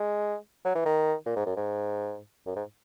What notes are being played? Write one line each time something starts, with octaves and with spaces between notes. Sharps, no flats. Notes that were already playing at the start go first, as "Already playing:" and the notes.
Already playing: G#3
F#3
E3
D#3
A#2
G#2
F#2
G#2
F#2
G#2